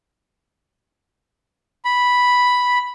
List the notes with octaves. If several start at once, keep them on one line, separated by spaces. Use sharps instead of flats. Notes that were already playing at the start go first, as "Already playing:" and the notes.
B5